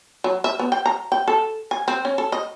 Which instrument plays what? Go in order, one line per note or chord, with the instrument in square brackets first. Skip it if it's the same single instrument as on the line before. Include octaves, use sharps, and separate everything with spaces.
[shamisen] F#3
E5
B3
G5
A#5
G5
A4
G#5
C4
C#4
A4
D#5